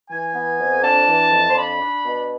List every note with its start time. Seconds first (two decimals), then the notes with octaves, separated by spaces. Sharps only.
0.09 E3 G#5
0.34 B3
0.58 F2
0.82 D4 A5
1.07 E3
1.31 F2
1.50 C6
1.55 D4 B5
1.80 D4
2.04 B2